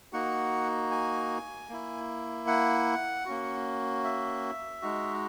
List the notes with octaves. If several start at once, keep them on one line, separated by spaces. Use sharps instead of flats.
A#3 D#4 F#4 F#5
G#5
A#3 E4
F#5
A#3 C#4 F#4
E5
G#3 D#4 F#4